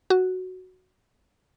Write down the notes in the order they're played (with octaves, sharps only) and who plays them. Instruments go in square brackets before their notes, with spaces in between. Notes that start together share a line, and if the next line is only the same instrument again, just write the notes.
[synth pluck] F#4